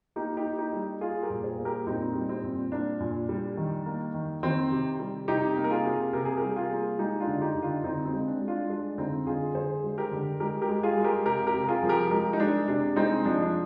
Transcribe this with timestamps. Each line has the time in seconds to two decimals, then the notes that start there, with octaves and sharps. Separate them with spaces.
0.16 A#3 D#4 G4
0.37 D#4 G4
0.44 A#3
0.58 D#4 G4
0.73 G3
1.01 G3 F4 G#4
1.23 G4 A#4
1.30 A#2
1.44 G#4 C5
1.58 A#3
1.65 G4 A#4
1.87 A#2 C4 D#4
2.15 G3
2.29 C4
2.43 A#2
2.72 A#3 D4
3.00 A#2
3.29 G3
3.57 D#3
3.86 A#3
4.14 D#3
4.43 D#3 C4
4.72 C3
5.00 G3
5.28 C3 D#4 G4
5.57 A#3
5.64 A#4
5.71 F4 G#4
5.85 C3
6.13 C3 A#4
6.25 G#4
6.37 G3 G4 A#4
6.56 F4 G#4
6.71 A#3
6.99 G#3 D#4 G4
7.20 D4 F4
7.27 D3
7.42 D#4 G4
7.56 D3
7.62 D4 F4
7.84 D3 C4 D#4
8.06 C4
8.13 G#3
8.27 D4
8.41 G#3
8.48 D4 F4
8.69 G#3 D4
8.98 D3 C4 D#4
9.26 D3 F4 G#4
9.55 D3 G#4 C5
9.83 G#3
9.98 G4 A#4
10.12 D3
10.40 G#3 G4 A#4
10.62 G4 A#4
10.69 G#3
10.83 F4 G#4
10.97 G#3
11.04 G4 A#4
11.26 C3 G4 A#4
11.47 G4 A#4
11.54 C3
11.64 A#4
11.68 F4 G#4
11.83 F3
11.89 G4 A#4
12.11 G#3 G4 A#4
12.33 D#4
12.39 G#3 D4
12.68 C3 D4
12.96 G#3 C4 D#4
13.25 F3 D4
13.42 D4